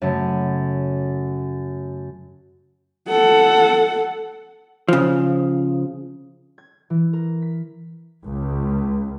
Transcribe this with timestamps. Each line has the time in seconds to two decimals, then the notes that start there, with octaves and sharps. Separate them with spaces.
0.02 F#2 C#3 A3
3.09 A4 F#5
4.88 C#3 F3
6.58 G#6
6.90 E3
7.13 A#4
7.42 B6
8.25 C#2